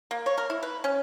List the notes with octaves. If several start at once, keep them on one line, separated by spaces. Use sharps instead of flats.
A#3
C#5
A#4
E4
B4
C#4